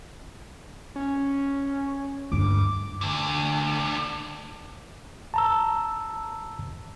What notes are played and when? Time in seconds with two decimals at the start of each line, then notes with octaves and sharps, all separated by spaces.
0.96 C#4
2.32 D2 G2 D6
3.01 D2 D3
5.34 A5 A#5 E6